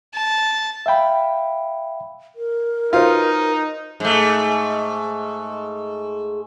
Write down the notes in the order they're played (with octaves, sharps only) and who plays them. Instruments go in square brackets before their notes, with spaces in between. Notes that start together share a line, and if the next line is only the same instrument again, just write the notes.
[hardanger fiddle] A5
[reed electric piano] E5 F5 G5 B5
[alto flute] A#4
[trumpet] D#4 [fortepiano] F4 [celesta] F#4 B4 C5
[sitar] G#2 A3